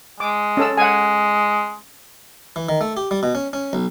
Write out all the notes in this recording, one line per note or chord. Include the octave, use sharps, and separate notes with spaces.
G#3 D6
C#4 A4 E6
G#3 F#5 G#5
E3
D#3
A3
G4
G3
B2
C#4
C#4
B1